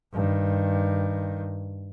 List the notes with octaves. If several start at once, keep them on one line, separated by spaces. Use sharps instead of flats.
G2 D#3